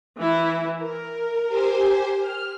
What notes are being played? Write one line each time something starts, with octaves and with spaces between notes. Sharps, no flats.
E3 E4
A#4
G4 C5 G#5
F6